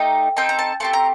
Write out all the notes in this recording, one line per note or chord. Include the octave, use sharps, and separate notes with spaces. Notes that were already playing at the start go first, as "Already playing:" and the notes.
Already playing: A3 D#4 G4
C4 D#4 A4 G5
A#5
A5
A3 C4 G4 A5
A#5